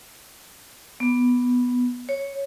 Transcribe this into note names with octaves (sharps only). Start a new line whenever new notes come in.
B3
C#5